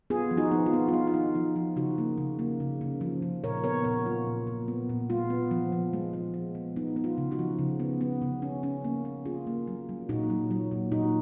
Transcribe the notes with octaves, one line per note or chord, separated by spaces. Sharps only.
B3 F4 G#4
F3
D#4 F#4
B3
F4
B3
F4
B3 D#4
F4
B3 D#4
F3 D#4
F3 F4
C#3 D#4 F#4
A#3
C#3
A#3
C#3
C#3
F3
C#3
A#2 A#4 C#5
B3 A#4 C#5
A#2 A#4 C#5
F#3 F4
A#2
A#2
B3
A#2
G#3 F4
B3
F3
F3
G#3
F3
G#3
B3
B3 D#4
B3
F4
C#3
D#4 F#4
F3
C#3
B3
B3
C#3
C#4
C#4
A#3
C#4
C#4 F4 G#4
A#3
F#3
F#3
A#2 D#4 F#4
F#3
F#3
A#2
A#2 D#4 F#4